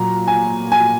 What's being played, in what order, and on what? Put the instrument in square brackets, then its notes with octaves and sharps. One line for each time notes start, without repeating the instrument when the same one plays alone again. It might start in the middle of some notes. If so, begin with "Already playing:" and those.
Already playing: [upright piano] A#2 F#3 A#5
G#5
G#5